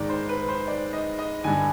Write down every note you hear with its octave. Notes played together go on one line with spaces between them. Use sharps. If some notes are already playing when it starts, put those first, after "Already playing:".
Already playing: G#2 D#3 D5
C5
B4
C5
D5
D#5
D#5
G2 D3 G#5